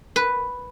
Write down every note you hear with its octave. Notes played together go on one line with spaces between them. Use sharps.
B4